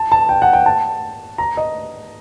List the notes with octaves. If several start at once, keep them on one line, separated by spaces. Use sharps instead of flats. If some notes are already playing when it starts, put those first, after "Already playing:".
Already playing: A5
A5
G5
F#5
G5
A5
A#5
D#5